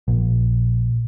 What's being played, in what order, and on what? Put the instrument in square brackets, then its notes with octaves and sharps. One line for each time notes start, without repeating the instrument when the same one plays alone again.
[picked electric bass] A#1